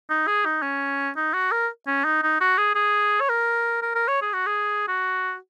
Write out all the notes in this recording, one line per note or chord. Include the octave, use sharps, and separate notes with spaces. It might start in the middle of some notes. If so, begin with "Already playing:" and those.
D#4
G#4
D#4
C#4
D#4
F#4
A#4
C#4
D#4
D#4
F#4
G#4
G#4
C#5
A#4
A#4
A#4
C#5
G#4
F#4
G#4
F#4